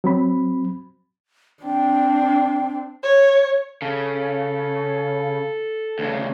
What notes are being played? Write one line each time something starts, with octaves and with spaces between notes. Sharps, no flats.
F#3 C4 B5
C4 D4 G5
C#5
C#3 A4
D2 C#3